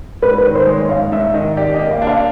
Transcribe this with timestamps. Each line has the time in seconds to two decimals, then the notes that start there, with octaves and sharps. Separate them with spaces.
0.22 G#2 B4
0.38 B4
0.45 D#3
0.55 C5
0.67 G#3
0.73 C#5
0.89 G#2 F5
1.12 G#2 E5
1.34 D#3 D#5
1.57 G4 D5
1.74 D#5
1.79 A#3
1.91 F5
2.02 D4
2.07 F5